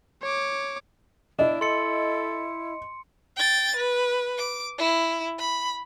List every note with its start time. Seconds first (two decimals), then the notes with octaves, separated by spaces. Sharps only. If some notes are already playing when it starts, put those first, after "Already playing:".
0.22 C#5 D6
1.39 D4 E4 D#5
1.61 A4 C6 C#7
3.36 G5 A6
3.76 B4
4.38 D6
4.78 E4
5.39 B5